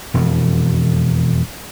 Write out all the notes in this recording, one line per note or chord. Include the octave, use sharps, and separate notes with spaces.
E1 F2